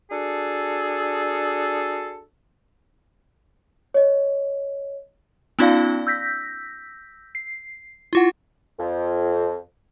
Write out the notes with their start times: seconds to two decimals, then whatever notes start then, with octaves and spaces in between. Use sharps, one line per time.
0.11 D4 F#4 G#4 A4
3.94 C#5 D#5
5.59 B3 C#4 D#4 F4 D5 F5
6.07 E6 G6 A#6 B6
7.35 C7
8.13 E4 F4 F#5
8.79 F2